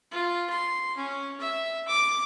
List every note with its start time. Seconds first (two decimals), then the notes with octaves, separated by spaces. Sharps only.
0.11 F4
0.50 C6
0.96 C#4
1.40 E5
1.88 D6